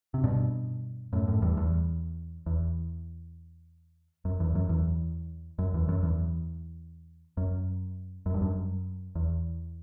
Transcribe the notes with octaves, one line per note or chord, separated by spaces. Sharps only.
C3
G2 B2
F#2 A2
F#2 A2
E2 G2
E2
E2
F#2
E2
F#2
E2
F#2
E2
F#2
E2
F#2
F#2
G2
F#2
E2